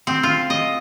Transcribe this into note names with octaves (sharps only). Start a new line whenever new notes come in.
C4
F4
D#5